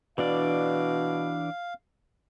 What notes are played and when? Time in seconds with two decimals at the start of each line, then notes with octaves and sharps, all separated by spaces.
0.18 B2 E3 D4 D5 F5